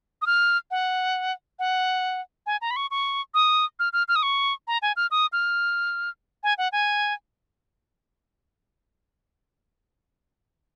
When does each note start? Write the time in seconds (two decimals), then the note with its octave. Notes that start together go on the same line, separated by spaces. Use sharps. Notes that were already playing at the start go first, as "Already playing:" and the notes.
0.22 D#6
0.27 F6
0.71 F#5
1.59 F#5
2.46 G#5
2.61 A#5
2.71 B5
2.76 C#6
2.91 C#6
3.34 D#6
3.79 F6
3.93 F6
4.08 F6
4.16 D#6
4.23 C#6
4.68 A#5
4.82 G#5
4.96 F6
5.11 D#6
5.33 F6
6.43 G#5
6.58 F#5
6.72 G#5